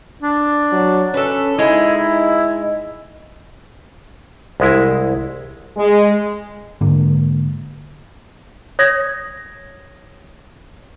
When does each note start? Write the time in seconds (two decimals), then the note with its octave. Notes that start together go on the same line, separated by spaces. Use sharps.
0.23 D4
0.72 F#3
1.14 C#4 A4 B4
1.59 G#3 D#4 E4
1.96 E4
4.60 C2 G#3 E4
5.77 G#3
6.81 G#2 D3 G#3 A#3
8.79 C#5 D#6 G#6 A#6